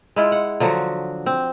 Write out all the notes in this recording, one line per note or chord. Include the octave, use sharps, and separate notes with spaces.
G#3 E4 F4
F#5
D3 F3 F#3 F#4
C4